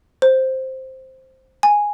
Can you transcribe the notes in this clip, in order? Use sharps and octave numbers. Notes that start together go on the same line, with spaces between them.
C5
G#5